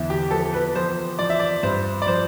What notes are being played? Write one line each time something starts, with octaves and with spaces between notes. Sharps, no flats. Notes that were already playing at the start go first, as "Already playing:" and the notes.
Already playing: E2 D3 E4
G4
F3 A4
B4
F3 C5
F3 D5
E5
D5
G2 C5
D5
F3 C5